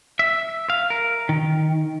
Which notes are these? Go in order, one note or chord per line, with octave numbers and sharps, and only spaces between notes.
E5
F5
A#4
D#3